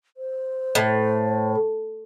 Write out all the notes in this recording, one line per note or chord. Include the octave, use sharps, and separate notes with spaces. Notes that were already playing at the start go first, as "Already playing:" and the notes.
C5
A2